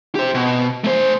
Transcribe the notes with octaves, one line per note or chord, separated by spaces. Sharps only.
G4 C5
B2
A3 C5